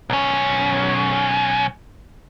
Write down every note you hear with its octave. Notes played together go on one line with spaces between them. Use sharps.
B1 C#4